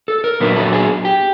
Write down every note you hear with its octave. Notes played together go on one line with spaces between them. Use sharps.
A4
A#4
A#2 F#3 B3 D4 B4
A4
G#4
G4